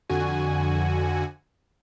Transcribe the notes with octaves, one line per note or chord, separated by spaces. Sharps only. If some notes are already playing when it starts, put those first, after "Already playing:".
F2 D3 F#4 G#5